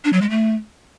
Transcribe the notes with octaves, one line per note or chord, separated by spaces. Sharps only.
D4
F#3
G#3
A3